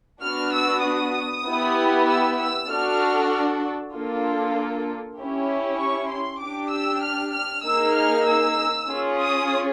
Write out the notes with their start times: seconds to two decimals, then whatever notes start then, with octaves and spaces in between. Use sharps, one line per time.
0.21 B3 D4 F#4 F6
0.52 E6
0.83 D#6
1.46 B3 E4 G4
2.08 E6
2.39 E6
2.69 D4 F#4 A4 F6
3.93 A#3 D4 F4 A4
5.17 C#4 E4 G4
5.79 C#6
6.09 C6
6.41 D4 G4 D6
6.72 E6
7.03 F6
7.33 F6
7.64 A#3 D#4 G#4 E6
7.96 F6
8.27 E6
8.89 C#4 F4 G#4
9.20 D#6